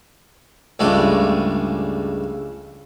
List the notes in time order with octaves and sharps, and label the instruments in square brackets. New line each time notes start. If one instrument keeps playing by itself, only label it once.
[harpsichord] C#2 G2 G#3 A3 D5